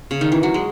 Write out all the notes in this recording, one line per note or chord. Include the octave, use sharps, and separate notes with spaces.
C#3
D#3
E3
F#3
G#3